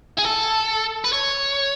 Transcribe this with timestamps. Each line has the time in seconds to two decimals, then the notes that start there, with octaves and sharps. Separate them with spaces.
0.18 G#4
0.24 A4
1.04 B4
1.13 C#5